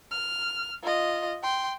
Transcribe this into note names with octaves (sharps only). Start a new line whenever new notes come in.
F6
F4 D#5
G5 C6